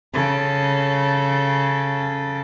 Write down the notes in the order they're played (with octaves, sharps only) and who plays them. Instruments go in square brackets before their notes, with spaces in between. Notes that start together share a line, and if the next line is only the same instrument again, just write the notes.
[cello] C#3 A4